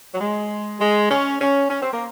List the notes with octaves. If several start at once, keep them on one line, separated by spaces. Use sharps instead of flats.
F#3
G#3
G#3
C#4
C#4
C#4
C4
A#3